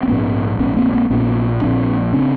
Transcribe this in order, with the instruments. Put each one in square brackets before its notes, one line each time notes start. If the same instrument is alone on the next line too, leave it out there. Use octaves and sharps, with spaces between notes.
[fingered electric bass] C4
A#1 G#2 B3 C#4
A#1 G#2 B3 C#4
A#3 C4
A#3 C4
A#1 A#2 B3 C#4
A#1 A#2 C4 D4
C#3 C4 D4